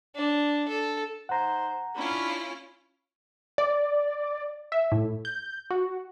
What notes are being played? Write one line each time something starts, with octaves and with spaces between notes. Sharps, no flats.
D4
A4
D#4 C5 F#5 A#5
C#4 D4 E4 F4 B5
D5
E5
A2
G6
F#4